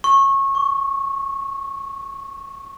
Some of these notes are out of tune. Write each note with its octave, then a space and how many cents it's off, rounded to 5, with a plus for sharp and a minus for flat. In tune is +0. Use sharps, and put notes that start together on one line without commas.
C#6 -20
C#6 +25